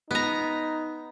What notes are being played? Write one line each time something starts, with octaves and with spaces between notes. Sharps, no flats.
B3 D#4 A#5